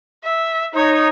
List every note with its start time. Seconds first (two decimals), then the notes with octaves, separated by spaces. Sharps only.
0.24 E5
0.74 D#4 C#5